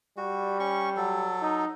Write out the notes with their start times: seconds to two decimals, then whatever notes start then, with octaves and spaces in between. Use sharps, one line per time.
0.17 G3 F#4
0.60 C#4 C#6
0.97 F#3 A4
1.42 D#4